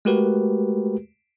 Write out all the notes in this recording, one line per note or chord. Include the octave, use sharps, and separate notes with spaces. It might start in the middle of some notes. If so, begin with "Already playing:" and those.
G#3 A3 F#4 G4 A#4 B4